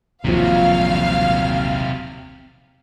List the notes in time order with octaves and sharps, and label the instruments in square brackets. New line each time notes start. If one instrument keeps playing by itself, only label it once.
[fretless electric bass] D#1 A#1 F3 [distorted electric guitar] C3 F#3 [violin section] F5 F6